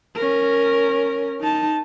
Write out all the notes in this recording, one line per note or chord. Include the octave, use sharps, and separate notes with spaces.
C#4 A#4
D#4 A5